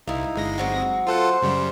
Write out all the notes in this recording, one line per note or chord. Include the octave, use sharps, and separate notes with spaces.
C2 D#4 E4 F5
G1 G#3 A#6
F#3 C4 F#4
F4 A4 C5 F#5
F#2 C#3 G3